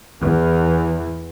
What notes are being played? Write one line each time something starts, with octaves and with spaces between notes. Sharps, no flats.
E2 E3